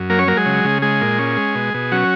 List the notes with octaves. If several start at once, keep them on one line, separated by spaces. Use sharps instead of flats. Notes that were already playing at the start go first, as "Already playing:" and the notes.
Already playing: F#2
F#3 A#3 A#4
C#4 C#5
F#3 A#3 A#4
G#3 G#4
C#3
C#3
G#3 G#4
A#2
C#4
G#3
B2
B2
F#3 C#4 F#4